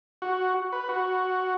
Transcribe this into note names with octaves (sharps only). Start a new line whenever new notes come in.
F#4
B4
F#4